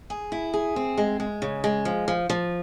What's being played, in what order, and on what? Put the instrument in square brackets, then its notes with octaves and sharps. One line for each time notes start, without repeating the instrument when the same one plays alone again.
[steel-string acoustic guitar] G#4
E4
G#4
C4
G#3
G#3
C#3
G#3
F3
F3
F3